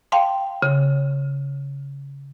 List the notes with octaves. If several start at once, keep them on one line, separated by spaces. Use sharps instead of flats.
F5 G5 A5 C6
C#3